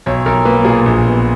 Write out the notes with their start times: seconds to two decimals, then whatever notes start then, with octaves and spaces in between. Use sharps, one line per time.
0.06 B1 C#5
0.26 B1 A#4
0.45 A#3 B4
0.65 A#2 G#4
0.86 A#1
1.06 B3